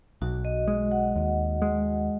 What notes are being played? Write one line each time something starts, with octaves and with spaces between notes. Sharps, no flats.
B1 F#4
D#5
G#3 D#5
F#5
D#2
G#3